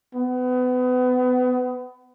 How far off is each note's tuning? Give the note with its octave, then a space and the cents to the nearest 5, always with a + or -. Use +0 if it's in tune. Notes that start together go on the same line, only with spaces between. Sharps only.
B3 +30